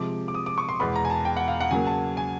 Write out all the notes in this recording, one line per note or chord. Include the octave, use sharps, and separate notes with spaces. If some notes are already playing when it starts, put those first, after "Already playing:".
Already playing: C3 F3 G#3 D6
D6
D#6
D6
C#6
C6
E2 B2 G#3 B3 B5
A#5
G#5
A5
G5
F#5
F5
F#5
C#3 F#3 A#3 G#5
A5
G#5